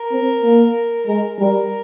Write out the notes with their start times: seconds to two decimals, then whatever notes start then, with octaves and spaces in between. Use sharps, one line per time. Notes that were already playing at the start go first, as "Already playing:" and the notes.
Already playing: A#4
0.11 C4
0.43 A#3
1.06 G#3 A#4
1.38 G3 A#4